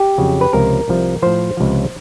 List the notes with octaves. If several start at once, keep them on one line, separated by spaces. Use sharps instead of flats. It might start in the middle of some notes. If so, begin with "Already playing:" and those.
Already playing: G4
F2 C#3 F#3
B4
C#2 C3 F3 A#4
C2 C3 F3
A2 F3 C5
C#2 C3 F3